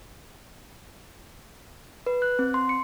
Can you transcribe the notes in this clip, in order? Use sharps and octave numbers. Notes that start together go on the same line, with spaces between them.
B4
F#6
C4
C6
C#7